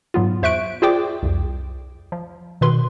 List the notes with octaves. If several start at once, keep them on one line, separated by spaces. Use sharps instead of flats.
G#2 F#3 B3 F4
E2 C5 E5 C#6 F#6 D7
F4 G#4 C5 D5 G5 D6
C2 F2
F3
B2 D#3 B4 C6